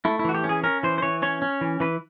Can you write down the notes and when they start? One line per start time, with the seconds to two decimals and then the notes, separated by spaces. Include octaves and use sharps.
0.05 A3 E4
0.19 E4
0.25 E3 F#4
0.35 G4
0.44 C#4
0.49 G#4
0.64 C#4 A#4
0.83 E3 C5
0.98 C5
1.02 E3 C#5
1.22 C#4 C#5
1.42 C#4
1.61 E3
1.80 E3 B4